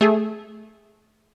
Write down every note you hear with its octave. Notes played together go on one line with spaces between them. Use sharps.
A3 G#4